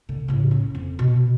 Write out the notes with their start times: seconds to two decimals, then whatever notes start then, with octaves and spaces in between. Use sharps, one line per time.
0.09 D3
0.28 A2 C#3
0.51 C#4
0.75 F2
0.99 B2